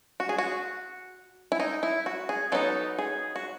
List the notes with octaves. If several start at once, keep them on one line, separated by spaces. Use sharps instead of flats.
F#4
G#4
F#4
E4
D#4
E4
F#4
G#4
F#3 B3 D#4 A4
G#4
F#4